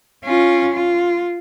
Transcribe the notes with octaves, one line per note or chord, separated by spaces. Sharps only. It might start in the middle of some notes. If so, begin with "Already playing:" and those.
C#4 F4
F4